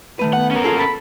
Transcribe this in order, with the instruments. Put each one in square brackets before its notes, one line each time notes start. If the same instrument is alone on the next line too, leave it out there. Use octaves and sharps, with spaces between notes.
[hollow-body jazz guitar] D#3 A3 B4
[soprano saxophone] B3 [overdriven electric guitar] F#5
[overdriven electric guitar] C#4 A#4
[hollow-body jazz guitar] A#3 F4 G#4 [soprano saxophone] A4
[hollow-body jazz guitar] A4 A5 [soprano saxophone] B5